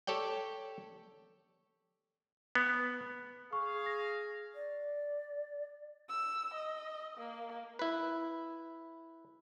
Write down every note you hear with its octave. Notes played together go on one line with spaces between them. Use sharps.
G4 A4 C#5 D5 G5
B3
G#4 F5 C#6
A#6
D5
E6
D#5
A#3
E4 B4